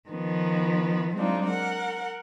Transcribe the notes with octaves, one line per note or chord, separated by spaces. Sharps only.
D#3 F3 B3
F#3 G#3 C4 D4 D#4 F4
A#4 F#5